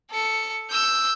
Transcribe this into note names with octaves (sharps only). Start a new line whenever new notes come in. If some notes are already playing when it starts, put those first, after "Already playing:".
A4 C#7
E6 G6